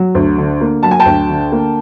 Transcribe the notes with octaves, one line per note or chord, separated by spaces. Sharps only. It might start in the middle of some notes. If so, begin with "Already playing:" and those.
Already playing: F#3
D2
D3
A#3
F#3 A5
G#5
G5 A5
D2
D3
A#3